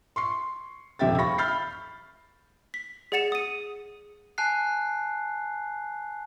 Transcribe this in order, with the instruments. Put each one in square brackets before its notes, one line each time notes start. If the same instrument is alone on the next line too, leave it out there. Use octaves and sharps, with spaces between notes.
[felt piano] C6 C#6 C7
D#1 F2 C3 E5 G5 A6
F5 B5 C#6 A#6
B5 F6 G6 A6 C7
[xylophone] B6
G#4 D5 F#5 A6 C#7 E7
D#6 D#7
[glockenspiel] G#5 A5 F#6 C7